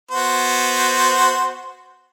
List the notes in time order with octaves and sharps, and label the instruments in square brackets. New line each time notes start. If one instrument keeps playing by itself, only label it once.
[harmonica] B3 F#4 C5